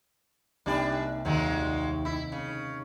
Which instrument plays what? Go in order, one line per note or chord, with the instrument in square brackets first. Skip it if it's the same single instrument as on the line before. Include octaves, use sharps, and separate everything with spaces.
[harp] C2 A#3 D#4 [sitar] G3 D4 D5
[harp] D#2 D#3 [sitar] A#2 F#3 G#3
[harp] D#4 E6 B6 [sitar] E4
[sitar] C#3